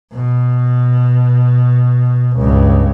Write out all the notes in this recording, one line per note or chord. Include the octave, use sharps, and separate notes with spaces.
B2
C#2 G2